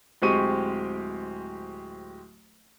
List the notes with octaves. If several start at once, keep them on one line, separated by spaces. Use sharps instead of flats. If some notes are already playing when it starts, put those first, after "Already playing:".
D1 G#3 C4 G4 C#6 D#7